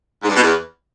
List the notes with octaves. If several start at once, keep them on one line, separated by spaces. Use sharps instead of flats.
G#2
G2
B2
E2